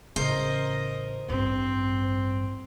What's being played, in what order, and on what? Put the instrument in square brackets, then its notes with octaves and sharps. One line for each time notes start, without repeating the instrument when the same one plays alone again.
[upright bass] A1 C#3 [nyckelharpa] A#4 D#5 [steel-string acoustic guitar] C5
[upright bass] A1 G2 [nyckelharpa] C4